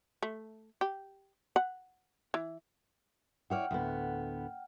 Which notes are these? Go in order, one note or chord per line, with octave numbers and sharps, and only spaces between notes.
A3
G4
F#5
E3
E4 C#5 D5 F#5 G5 F6
D2 A2 B3